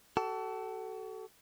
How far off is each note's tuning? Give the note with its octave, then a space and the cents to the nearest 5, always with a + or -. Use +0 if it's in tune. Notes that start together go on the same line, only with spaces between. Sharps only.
F#4 +40 A4 +0